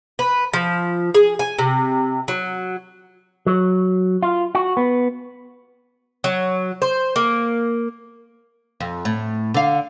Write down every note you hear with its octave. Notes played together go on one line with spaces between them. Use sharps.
B4
F3
G#4
G#5
C3
F#3
F#3
F4
F#4
B3
F#3
C5
A#3
F2
A2
D3 F5